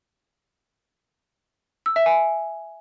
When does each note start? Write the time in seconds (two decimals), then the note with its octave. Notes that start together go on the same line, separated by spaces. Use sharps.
1.86 E6
1.96 E5
2.06 G#5